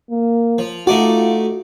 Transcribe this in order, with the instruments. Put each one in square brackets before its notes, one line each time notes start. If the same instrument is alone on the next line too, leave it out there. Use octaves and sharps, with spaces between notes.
[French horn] A#3
[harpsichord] F3
[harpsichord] A3 D#4 D5 [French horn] F4 [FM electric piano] F#4